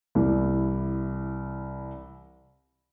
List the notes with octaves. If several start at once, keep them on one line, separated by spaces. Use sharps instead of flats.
C2 E3